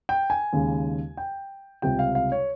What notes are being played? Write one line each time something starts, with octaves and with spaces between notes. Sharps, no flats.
G5
G#5
D#2 C#3 G#3
G5
C#2 C3 G3 G5
F5
F5
C#5